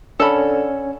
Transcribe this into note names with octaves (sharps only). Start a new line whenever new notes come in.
D3 C#4 A4 B5